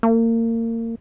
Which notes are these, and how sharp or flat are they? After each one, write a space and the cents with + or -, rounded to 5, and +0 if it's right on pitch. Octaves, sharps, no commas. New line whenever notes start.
A#3 -30